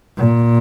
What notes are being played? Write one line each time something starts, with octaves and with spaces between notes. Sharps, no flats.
A#2